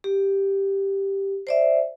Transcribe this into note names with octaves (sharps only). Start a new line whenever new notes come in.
G4
C5 D5 E5